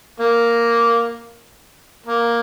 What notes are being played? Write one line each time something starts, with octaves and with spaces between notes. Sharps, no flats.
A#3
A#3